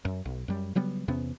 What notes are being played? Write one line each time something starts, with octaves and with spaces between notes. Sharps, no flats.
F#2
B1
F#2 G3
C#3 F#3 G3 B3
E2 C3 B3 C#4